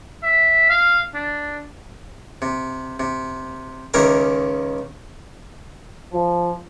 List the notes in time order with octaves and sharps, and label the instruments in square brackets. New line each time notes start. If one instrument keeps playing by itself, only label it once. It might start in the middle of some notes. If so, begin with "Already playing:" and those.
[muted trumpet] E5
F5
D4
[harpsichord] C3
C3
C#2 D#3 C#4 A#4 E5 D6
[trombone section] F3